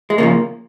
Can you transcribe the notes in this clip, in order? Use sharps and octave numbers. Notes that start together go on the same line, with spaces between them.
G#3
C#2 C#3 F3 A#3